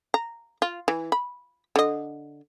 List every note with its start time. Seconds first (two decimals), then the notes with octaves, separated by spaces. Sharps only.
0.14 A#5
0.62 F4
0.88 E3
1.12 B5
1.76 D3 D#5